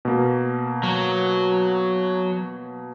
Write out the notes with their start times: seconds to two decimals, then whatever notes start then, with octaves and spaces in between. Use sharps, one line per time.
0.05 B2 A#3
0.83 F#3